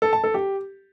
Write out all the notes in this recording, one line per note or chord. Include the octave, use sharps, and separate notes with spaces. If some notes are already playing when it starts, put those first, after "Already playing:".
A4
A5
A4
G4